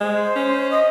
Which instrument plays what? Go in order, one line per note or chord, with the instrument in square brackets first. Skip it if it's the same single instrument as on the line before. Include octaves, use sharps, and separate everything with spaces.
[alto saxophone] G#3 [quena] C5
[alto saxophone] C#4
[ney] D#5 [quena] D#6